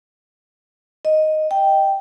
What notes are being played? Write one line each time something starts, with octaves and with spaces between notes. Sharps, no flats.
D#5
G5